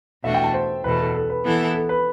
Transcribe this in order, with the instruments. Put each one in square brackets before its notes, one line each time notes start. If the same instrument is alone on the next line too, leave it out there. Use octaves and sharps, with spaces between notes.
[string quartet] E2 B2 A3 D4 F#4 [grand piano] E5
[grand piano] G5
A5
C5
[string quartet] E2 B2 A3 [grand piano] B4
[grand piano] A4
A4
B4
[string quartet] E3 B3 E4 A4
[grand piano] A4
B4